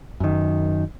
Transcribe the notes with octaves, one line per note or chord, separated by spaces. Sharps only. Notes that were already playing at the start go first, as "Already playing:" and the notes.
F#2 D#3